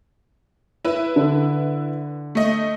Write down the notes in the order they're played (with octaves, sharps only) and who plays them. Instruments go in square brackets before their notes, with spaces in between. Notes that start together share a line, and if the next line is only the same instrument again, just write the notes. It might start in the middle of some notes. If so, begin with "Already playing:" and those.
[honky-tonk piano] E4 B4
[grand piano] D3
[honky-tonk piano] A3 D#5